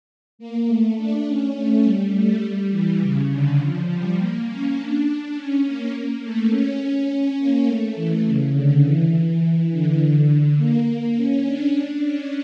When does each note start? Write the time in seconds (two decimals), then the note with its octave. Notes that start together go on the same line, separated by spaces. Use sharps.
0.39 A#3
0.67 A3
0.98 D4
1.26 C#4
1.56 A3
1.84 G3
2.14 A3
2.43 G3
2.71 E3
3.00 C#3
3.30 D3
3.59 F3
3.88 G3
4.17 A#3
4.46 C#4
4.76 D4
5.05 D4
5.34 C#4
5.63 A#3
5.92 A#3
6.22 A3
6.50 C#4
7.38 A#3
7.66 A3
7.95 E3
8.25 C#3
8.53 D3
8.84 E3
9.71 D3
9.99 D3
10.28 D3
10.57 A#3
10.86 A#3
11.16 C#4
11.45 D4
11.74 D4
12.04 C#4